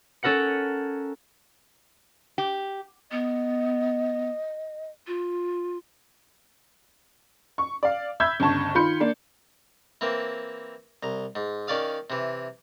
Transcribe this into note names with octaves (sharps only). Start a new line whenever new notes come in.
C#4 A4 A#4 F#5 C#7
G4
B3 D#5
F4
C#6
D5 F5
E5 B5 E6 G6 G#6
G1 C#2 A5 C#6
D#3 F4 B5 C6 G6 C#7
A#3 D4
E3 A#3 C4
C2 A#5
G#2
D#3 C#4 D5 F5 D#6
C3 E3